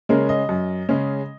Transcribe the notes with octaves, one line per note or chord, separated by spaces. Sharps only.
C#3 G#3 C#4 A#4
D#5
F#2
C#3 G#3 C#4